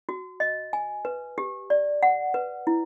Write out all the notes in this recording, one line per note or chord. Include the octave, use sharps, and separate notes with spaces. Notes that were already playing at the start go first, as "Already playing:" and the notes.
F#4
D#5
G#5
B4
G4
D5
F#5
B4
E4